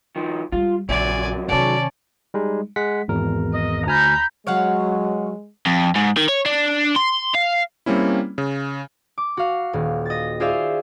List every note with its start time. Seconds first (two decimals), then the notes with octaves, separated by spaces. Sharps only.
0.16 D#3 F3
0.52 G3 G#3 F4
0.89 A#1 F2 C#3 F#3 D5 E5 G#5
1.48 B1 C3 D#3 F#3 C#4 D5 A5
2.34 G3 G#3 D#4
2.76 G#3 F#5 B6
3.08 G#1 E2 A#4
3.52 D#5
3.86 D2 G#5 A#5 B5 F6 G6
4.47 F#3 G#3 C#5 F5 F#5
5.66 F2
5.95 G#2
6.17 D#3
6.29 C#5
6.46 D4
6.96 C6
7.35 F5
7.86 G3 A#3 C4 C#4 E4
8.38 C#3
9.18 D6
9.37 F#4 F5
9.73 D#1
10.06 D#5 A6
10.40 F4 G#4 C5 D5 E5 F5